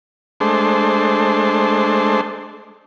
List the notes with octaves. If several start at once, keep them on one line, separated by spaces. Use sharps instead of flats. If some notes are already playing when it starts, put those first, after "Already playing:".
G#3 A3 D4 C5